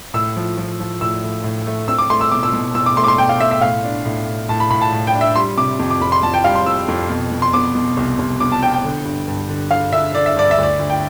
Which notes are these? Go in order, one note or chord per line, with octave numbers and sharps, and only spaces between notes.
A2 E6
F3
F3
F3
A2 E6
A2
A2
A3
C4 E6
D6
A3 C6
E6
B2 D6
E6
B2
B2 E6
D6
A3 C6
D6
C6
B2 G5
F5
A3 E5
E5
A2 F5
D4
A2
A2
A2 A5
B5
A2 B5
A5
A2
G5
D4
E5
G3 C6
C3 D6
F2
D6
F2 B5
C6
F2 A5
G5
G3 F5
C6
F2 E6
F2
B2
B2
C6
B3 D6
B2
C2
C2
B3 D6
A5
B3 G5
G5
D3
G2
G2
D3
D3 F5
D3 E5
D3 D5
E5
G2 D5
E5
D2 D5
D2
G5